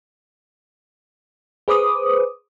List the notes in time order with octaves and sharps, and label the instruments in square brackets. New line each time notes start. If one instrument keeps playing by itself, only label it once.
[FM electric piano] G#4 B4 C5 D6 D#6